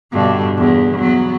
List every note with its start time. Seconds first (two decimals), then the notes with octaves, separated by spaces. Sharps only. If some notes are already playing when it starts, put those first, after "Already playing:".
0.12 G2 B2 D3
0.58 E2
0.98 F#3 B3